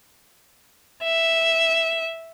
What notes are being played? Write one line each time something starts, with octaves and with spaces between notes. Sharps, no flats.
E5